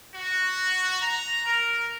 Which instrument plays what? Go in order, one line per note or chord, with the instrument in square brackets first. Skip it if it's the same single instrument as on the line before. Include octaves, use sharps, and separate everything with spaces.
[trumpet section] F#4
A#5
A#4